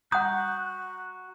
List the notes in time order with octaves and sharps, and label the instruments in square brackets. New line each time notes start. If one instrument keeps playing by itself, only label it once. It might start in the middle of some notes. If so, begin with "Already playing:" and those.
[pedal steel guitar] F#4 A#5 G6 [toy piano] F#5 D#6 [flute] F#6